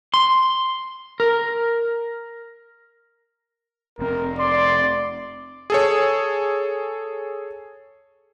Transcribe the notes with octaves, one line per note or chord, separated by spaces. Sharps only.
C6
A#4
F1 C4 A#4
D5 C6
G#4 A4 C#5